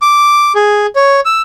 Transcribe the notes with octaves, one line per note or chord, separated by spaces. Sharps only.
D6
G#4
C#5
E6